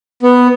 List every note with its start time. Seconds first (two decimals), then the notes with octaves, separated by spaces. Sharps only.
0.23 B3